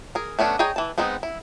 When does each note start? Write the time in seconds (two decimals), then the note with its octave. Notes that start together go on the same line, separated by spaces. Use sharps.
0.15 G#4 A#4
0.39 A3 B3 C#4 D4
0.59 G#4 C#5 D#5 G5 A#5
0.76 E3 A5
0.98 G#3 B3 C4 D#4
1.23 E4